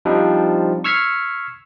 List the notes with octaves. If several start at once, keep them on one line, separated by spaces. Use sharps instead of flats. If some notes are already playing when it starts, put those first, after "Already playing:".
F3 G3 C4 D4 D#4
C#6 E6 F6 G#6 B6 C7